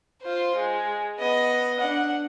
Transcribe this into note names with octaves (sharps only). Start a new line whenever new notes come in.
F4 C5
G#3
B3 D#5
D4 F#5